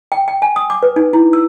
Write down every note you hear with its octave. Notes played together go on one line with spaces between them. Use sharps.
G5
G5
G#5
D#6
D6
B4
D#4
E4
E6